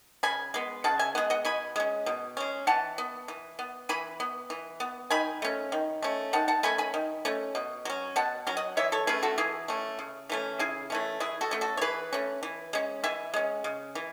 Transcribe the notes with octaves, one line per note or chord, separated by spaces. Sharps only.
C#3 G#5 B5
G#3 B3
C#3 F#5 A5
E5 G#5
G#3 B3 F#5
D#5 F#5
B2 G#5 B5
G#3 C#4
B2
G#3 C#4
E3 F#5 A5
B3
E3
B3
E3 G#5 B5
B3
E3
B3
D#3 G#5 B5
A3 C#4
D#3
A3 C#4
D#3 F#5 A5
F#5 A5
A3 C#4 G#5 B5
G#5 B5
D#3
A3 C#4
B2
F#3 C#4
B2 F#5 A5
F#3 C#4
D#5 F#5
E3 C#5 E5
A4 C#5
A3 C#4 G#4 B4
F#4 A4
E3 E4 G#4
A3 C#4
C#3
E3 A3 C#4
C#3 E4 G#4
E3 A3 C#4
E3 E4 G#4
F#4 A4
A3 C#4
F#4 A4
C#5
E3 G#4 B4
A3 C#4
E3
G#3 C#4
E3 E5 G#5
G#3 C#4
C#3
E3